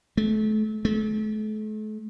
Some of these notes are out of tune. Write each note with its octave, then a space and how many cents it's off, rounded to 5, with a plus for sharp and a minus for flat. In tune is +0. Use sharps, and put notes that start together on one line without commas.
A3 -35
A3 -40